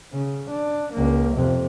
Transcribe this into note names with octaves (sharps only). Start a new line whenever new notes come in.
C#3
D4
C#2 A#3
F2 C3